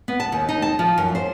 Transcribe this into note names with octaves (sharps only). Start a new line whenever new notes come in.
B3
A5
D#2
D#4
A5
F3
F#2
C5